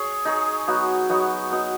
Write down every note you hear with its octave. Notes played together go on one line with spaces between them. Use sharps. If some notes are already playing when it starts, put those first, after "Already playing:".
Already playing: G#4 C#5
D#4 G#4 C#5
F#3 B3 D#4 F#4
F#3 B3 D#4 F#4
F#3 B3 D#4 F#4